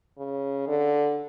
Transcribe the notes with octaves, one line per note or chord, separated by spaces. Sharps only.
C#3
D3